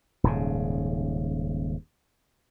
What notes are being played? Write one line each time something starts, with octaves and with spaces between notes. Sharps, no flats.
D#1 G#2 C#3